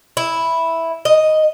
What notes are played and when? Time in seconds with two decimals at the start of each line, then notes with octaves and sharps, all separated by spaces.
0.17 E4
1.05 D#5